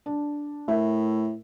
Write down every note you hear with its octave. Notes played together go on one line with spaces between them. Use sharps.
D4
A2 A#4 E5